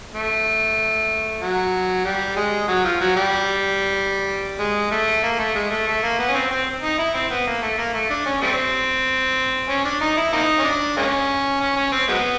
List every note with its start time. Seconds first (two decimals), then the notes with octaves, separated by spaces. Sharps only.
0.13 A3
1.42 F#3
2.05 G3
2.36 G#3
2.68 F#3
2.84 F3
3.01 F#3
3.16 G3
4.60 G#3
4.91 A3
5.24 A#3
5.39 A3
5.55 G#3
5.71 A3
5.87 A3
6.03 A#3
6.19 B3
6.28 C#4
6.34 C4
6.51 C4
6.82 D#4
6.99 E4
7.14 C4
7.30 B3
7.47 A#3
7.62 A3
7.78 A#3
7.94 A3
8.10 D4
8.26 C#4
8.42 G3 A3 C4
9.69 C#4
9.85 D4
10.01 D#4
10.17 E4
10.33 A#3 C4 D#4
10.59 C#4
10.64 D4
10.97 G#3 A#3 C#4
11.61 C#4
11.77 C#4
11.92 C4
12.08 F#3 G#3 B3